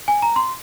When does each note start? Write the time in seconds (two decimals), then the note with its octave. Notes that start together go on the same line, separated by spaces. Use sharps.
0.08 G#5
0.22 A#5
0.36 C6